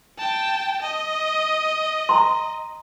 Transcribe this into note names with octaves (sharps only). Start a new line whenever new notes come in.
G5 A5
D#5
A#5 C6